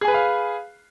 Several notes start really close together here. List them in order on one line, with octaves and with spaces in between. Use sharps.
G#4 G#5 B4 B5 F5